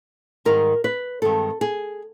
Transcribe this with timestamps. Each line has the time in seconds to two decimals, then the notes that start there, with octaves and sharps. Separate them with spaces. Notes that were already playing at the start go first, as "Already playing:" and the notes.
0.45 G#2 D#3 G3 A#4
0.84 B4
1.22 G2 D#3 G#3 C4 A4
1.61 G#4